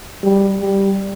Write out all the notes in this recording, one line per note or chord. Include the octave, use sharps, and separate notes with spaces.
G3
G3